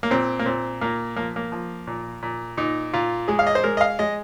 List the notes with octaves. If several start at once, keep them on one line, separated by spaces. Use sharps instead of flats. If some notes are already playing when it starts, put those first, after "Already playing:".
A#3
A#2 C4
A#3
A#2 C4
A#2 A#3
F3 A#3
A#3
F3
A#2
A#2
A#2 D#4
A#2 F4
G#3 G#4
F5
D#5
C5
G#3 A#4
D#5
F5
G#3 D#5